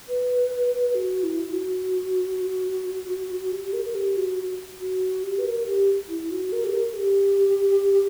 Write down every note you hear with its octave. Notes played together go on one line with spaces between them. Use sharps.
B4
F#4
E4
F#4
G4
A#4
A#4
G4
F#4
F#4
G4
B4
A#4
G4
E4
F#4
A#4
G4
A#4
G4